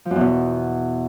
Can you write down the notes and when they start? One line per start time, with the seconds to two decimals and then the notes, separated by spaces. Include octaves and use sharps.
0.05 F3
0.11 F#2
0.16 E2
0.21 B2